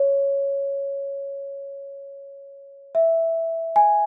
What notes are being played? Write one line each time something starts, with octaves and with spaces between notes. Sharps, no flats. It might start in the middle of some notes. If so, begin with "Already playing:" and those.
Already playing: C#5
E5
G#5